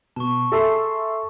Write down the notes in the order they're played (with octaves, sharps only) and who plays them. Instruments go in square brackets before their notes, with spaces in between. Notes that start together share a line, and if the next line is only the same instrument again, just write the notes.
[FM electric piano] B2 [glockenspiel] A5 C#6
[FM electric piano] G#4 E5 C6 [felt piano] A4